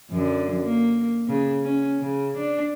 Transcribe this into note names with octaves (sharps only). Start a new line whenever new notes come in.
F#2 D3
A#3
C#3
C#4
C#3
D4